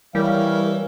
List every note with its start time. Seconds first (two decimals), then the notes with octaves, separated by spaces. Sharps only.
0.15 E3 G3 G4 A#4 C#5 F5